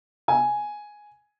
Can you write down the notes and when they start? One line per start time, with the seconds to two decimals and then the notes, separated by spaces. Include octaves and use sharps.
0.28 G#5